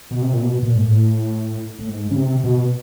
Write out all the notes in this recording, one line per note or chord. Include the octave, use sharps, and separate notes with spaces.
B2
C3
A#2
B2
A#2
G#2
A2
A2
G#2
C#3
C3
B2